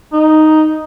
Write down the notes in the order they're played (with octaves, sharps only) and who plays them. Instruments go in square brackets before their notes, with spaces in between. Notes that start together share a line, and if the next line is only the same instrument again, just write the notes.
[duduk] D#4